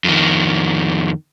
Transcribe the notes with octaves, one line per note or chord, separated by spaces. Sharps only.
F2 D#3